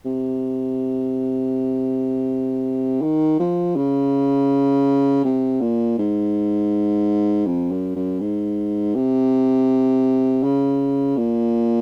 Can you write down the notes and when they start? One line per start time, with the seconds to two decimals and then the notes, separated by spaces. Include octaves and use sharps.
0.05 C3
3.02 D#3
3.39 F3
3.76 C#3
5.25 C3
5.61 A#2
5.98 G#2
7.46 F2
7.71 F#2
7.96 F#2
8.20 G#2
8.95 C3
10.43 C#3
11.17 A#2